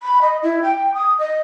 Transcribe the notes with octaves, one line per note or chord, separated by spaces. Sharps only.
B5
D#5
E4
G5
D#6
D#5